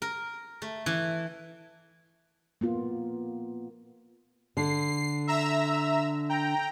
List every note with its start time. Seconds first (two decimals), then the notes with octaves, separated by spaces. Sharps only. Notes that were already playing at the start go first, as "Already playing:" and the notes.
0.02 A#4
0.62 A3
0.86 E3
2.61 A#3 B3 F4
4.57 D3 C7
5.27 E5 A#5 E6
6.29 G5 A#5